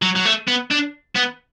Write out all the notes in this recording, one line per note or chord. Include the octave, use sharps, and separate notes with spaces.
F#3
F#3
A3
B3
D4
B3